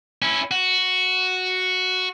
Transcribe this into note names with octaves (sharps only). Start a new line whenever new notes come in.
C#4 E4
F#4